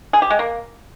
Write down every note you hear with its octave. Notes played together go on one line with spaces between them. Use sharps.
G#4
G4
G#3
A#3